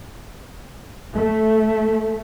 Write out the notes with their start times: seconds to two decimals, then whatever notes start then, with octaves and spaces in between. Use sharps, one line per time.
1.15 A3